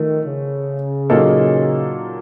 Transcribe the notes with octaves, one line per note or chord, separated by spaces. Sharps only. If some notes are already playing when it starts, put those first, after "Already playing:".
Already playing: D#3 F3 A3
C#3
A#2 F#3 A#3 D#4 A4